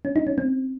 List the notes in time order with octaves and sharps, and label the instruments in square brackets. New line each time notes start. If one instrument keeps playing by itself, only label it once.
[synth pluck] C#4
D#4
C#4
C4